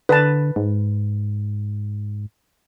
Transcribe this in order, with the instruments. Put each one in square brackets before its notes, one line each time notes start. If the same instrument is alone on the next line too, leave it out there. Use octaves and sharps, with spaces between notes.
[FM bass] D3 [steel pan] B4 A5
[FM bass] G#2